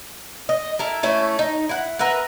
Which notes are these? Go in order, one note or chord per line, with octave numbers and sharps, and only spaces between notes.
D#5
E4 A4 A#4
A3 C#4 E4
D#4
E4 F#5
A#4 B4 E5 F#5